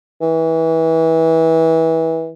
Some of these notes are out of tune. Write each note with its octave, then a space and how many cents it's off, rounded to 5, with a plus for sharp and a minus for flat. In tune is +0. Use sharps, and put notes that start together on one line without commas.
E3 -25